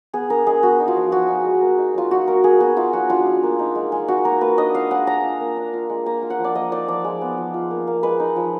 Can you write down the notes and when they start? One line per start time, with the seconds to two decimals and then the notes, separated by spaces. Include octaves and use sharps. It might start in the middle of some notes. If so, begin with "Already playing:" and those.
0.13 B3 G#4
0.30 D4 A#4
0.46 G#3 G#4
0.63 B3 F#4
0.79 D#4
0.88 F4
0.96 F3
1.12 B3 F#4
1.29 D#4
1.45 G#3
1.61 A#3
1.78 D#4
1.94 F#3 F4
2.11 D#4 F#4
2.27 A#3 A#4
2.44 A#3 G#4
2.60 B3 F#4
2.77 D#4 F4
2.93 F#3 F#4
3.10 D4 F4
3.26 F4
3.43 A#3
3.59 D#4
3.75 G#3
3.92 G#3
4.08 D#4 F#4
4.25 A#3 A#4
4.41 A#3 B4
4.58 D4 D#5
4.74 F4 F5
4.91 G#3 F#5
5.07 D4 A#5
5.24 F4
5.40 A#3
5.57 D4
5.73 F4
5.89 G#3
6.06 A#3 A#5
6.22 F4
6.30 F#5
6.39 F3
6.44 D5
6.55 A#3 D#5
6.72 D#4 D5
6.88 F3 D5
7.04 G#3
7.21 B3
7.38 F3
7.54 F4
7.71 A#3
7.87 A#3
8.03 G#3 B4
8.20 D#4
8.36 F3